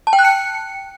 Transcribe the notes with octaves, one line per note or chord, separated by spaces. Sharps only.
A5
G5
F#6
C#7